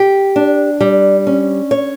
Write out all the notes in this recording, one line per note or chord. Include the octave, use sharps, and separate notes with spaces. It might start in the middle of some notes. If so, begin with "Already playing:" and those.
Already playing: G4
D4
G3
C#4
C#5